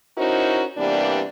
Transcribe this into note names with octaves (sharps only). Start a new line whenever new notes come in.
C#4 D#4 E4 F#4 A#4 C5
C3 E3 G3 A#3 B3 D4